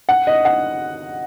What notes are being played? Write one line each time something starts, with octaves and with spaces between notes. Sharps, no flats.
F#5
D#5
F#5